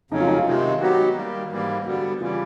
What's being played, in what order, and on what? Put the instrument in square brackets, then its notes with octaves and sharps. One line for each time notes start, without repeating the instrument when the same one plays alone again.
[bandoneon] F2 C#3 F#3 [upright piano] D#4
[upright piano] F4
D#4
F4
[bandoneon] C3 D#3 G#3
[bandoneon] F#3 B3 D#4 G4 [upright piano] F#4
[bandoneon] D#3 G3 A#3
G#2 E3 G3 A#3
[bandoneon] D3 G3 B3 [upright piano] F#4
[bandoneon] C#3 E3 G3 [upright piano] F4